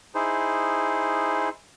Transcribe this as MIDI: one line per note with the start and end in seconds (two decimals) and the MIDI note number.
0.15 1.49 63
0.15 1.49 64
0.15 1.49 68
0.15 1.49 72